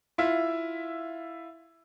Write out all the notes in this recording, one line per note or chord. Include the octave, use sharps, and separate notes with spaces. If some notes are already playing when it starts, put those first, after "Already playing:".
E4 F4 E5